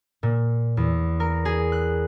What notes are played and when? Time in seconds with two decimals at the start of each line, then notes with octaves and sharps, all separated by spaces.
0.23 A#2
0.77 E2
1.20 A#4
1.45 G#4
1.72 F#6